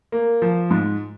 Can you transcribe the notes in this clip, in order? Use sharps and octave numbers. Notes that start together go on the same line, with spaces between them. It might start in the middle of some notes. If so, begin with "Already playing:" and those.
A#3
F3
G#2